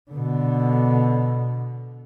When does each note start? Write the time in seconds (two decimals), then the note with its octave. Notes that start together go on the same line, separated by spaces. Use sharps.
0.11 B2 D3